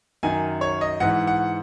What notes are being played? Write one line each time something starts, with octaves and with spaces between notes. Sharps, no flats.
F#2 D#3 G#5
C#5
D#5
G#2 E3 F#5
F#5